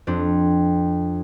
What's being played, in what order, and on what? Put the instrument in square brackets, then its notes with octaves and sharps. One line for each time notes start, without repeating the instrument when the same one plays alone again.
[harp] F2 C4 D4